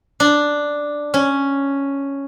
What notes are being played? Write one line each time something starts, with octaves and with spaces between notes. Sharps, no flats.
D4
C#4